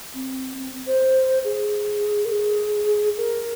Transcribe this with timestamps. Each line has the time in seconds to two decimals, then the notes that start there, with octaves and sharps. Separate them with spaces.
0.14 C4
0.58 C4
0.87 C5
1.44 G#4
2.25 A#4
2.31 G#4
3.17 A#4